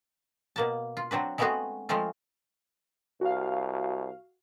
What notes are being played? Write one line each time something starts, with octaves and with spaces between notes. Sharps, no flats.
B2 A#3 A5
F4
F#3 C4 D4 B4
G#3 A3 B3 C4 F#4 G#4
F3 G#3 A3 C4 F4
C2 F#4 F5